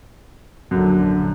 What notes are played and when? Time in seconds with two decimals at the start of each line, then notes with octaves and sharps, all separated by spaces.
0.71 A#1 F#2 D3